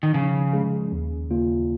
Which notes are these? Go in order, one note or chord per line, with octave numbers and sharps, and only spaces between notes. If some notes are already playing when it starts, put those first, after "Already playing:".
D#3
C#3 F3
G#3 C#4 G#4
D#2
C#3 A#3 F4